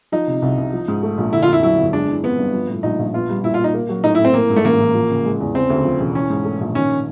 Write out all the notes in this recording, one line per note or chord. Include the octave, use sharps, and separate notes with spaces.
F3 D#4
C3
C2
C2
F3
G#2
A3
A#1
D3 E4
F4
F2 E4
F#3 E4
G1
G#3 D4
E3
B3 C4
G2
F3
A2
A#1 D#4
A#1
B3 F4
G3
A#2 E4
F4
A#2
D#4
A#3
F#3
A2 D#4
E4
A2
C4
E3 A#3
G#2
A3
A1 A#3
A1
F3
C#3
G#3
E2
C#3 C4
D2
F3
E1
E3 C#4
G#2
A3
A#1
D#3 C#4